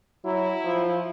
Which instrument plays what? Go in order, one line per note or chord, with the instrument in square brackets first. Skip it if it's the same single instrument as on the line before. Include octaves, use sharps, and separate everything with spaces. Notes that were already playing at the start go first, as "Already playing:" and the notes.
[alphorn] F#3 [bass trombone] E4
[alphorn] F3